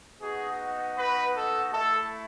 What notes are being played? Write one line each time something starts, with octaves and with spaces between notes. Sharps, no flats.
B3 D#4 F#4 G#4
B4
A4
A3 E4 A4